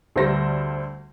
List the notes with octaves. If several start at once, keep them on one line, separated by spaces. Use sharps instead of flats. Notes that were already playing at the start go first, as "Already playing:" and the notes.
D2 D3 G3 C5 A#6